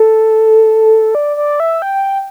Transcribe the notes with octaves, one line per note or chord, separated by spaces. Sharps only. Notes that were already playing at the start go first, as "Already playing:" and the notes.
Already playing: A4
D5
D5
E5
G5